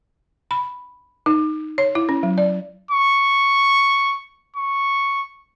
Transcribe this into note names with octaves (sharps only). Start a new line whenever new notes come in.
B5
D#4
C#5
E4
C#4
F#3
D5
C#6
C#6